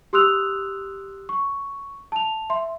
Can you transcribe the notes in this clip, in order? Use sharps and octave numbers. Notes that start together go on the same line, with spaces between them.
G4 C6 D#6 E6 F#6 F7
C#6
A5 F7
E5 C6